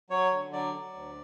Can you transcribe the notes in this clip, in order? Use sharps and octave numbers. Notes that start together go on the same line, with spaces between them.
F#3 C#5
D3
F#3 D5
F#3
D2